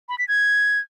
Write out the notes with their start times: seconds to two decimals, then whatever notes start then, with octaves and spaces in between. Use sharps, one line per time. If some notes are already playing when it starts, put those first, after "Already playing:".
0.09 B5
0.18 B6
0.28 G#6